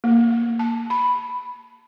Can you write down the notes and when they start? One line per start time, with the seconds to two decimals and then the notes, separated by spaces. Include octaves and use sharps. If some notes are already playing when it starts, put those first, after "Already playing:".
0.04 A#3
0.59 A5
0.90 B5